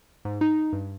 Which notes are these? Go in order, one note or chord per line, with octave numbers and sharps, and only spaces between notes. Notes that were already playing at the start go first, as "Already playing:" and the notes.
G#2
D#4
G2